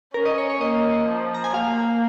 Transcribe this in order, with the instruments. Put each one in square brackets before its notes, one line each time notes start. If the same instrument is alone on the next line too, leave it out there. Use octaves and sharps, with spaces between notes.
[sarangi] C#4 [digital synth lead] A#4
[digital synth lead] D#5
C#5
C#5
[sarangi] A#3 [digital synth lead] D#5
[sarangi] F3
[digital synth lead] A#5
G#5
[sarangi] A#3 [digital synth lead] F5